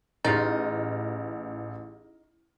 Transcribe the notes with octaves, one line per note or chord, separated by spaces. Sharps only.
A1 D#4 G4 G#4 F6 A6